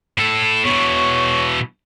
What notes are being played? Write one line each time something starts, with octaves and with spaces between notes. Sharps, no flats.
A2 A4
B2 E3 C#5